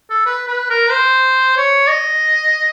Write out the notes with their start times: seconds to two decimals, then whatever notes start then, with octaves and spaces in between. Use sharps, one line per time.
0.10 A4
0.26 B4
0.48 B4
0.70 A#4
0.91 C5
1.57 C#5
1.89 D#5